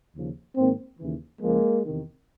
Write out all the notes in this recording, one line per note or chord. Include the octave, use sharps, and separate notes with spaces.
D#2 C#3 F3
G#2 D#3 A#3 C4
D#2 C#3 E3
C#2 C#3 F3 G#3 A#3
E2 C3 D#3